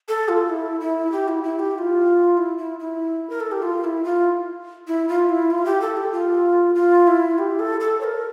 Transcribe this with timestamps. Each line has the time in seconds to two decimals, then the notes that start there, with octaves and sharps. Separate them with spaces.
0.08 A4
0.28 F4
0.49 E4
0.80 E4
1.12 G4
1.28 E4
1.44 E4
1.59 G4
1.75 G4
1.78 F4
2.37 E4
2.58 E4
2.80 E4
3.30 A#4
3.40 A4
3.51 G4
3.62 F4
3.84 E4
4.04 F4
4.87 E4
5.09 F4
5.29 E4
5.51 F4
5.65 G4
5.81 A4
5.97 G4
6.12 F4
6.75 F4
7.07 E4
7.38 G4
7.59 A4
7.80 A4
8.00 C#5
8.04 A#4